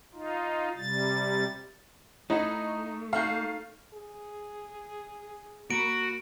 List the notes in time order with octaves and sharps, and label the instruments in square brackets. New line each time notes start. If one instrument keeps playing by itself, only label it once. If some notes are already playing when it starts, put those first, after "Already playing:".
[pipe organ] D#4 F4
C3 G3 A6
[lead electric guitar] A3 [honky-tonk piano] D#4 [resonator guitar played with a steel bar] E4 D#5 F#5
[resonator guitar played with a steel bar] D#4 F#4 A4 [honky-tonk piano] F5
[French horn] G#4
[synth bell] A#3 B5 [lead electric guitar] F#4 [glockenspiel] D7